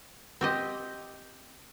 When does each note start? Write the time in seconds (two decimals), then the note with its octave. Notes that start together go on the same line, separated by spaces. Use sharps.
0.41 C4 G4 D#5